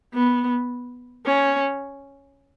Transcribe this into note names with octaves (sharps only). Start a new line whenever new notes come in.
B3
C#4